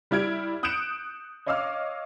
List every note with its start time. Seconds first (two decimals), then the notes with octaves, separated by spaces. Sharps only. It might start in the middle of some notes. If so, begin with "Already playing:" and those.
0.11 G3 E4 F6 G#6 D7
0.63 D#6 F#6 G6 C#7 D7 E7
1.46 C#5 D#5 F5 D6 E6 F6